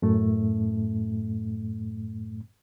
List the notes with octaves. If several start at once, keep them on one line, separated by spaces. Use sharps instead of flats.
F#2 A2 A3